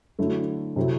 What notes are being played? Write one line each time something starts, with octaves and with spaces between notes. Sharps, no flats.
D3 F#3 A3 E4 A4
C3 F#3 C4 E4 A4